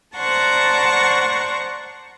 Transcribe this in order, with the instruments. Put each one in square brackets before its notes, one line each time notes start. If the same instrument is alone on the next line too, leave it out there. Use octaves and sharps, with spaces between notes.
[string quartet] C5 D5 F#5 A5 A#5 C#6